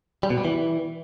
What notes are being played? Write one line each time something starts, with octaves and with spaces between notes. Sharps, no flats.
G3
B2
G3
E3